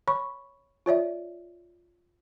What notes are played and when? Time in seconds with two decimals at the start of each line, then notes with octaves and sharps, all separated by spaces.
0.08 C#5 B5 C#6
0.86 F4 C#5 D5 E5